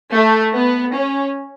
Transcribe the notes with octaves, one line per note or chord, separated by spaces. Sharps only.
A3
B3
C#4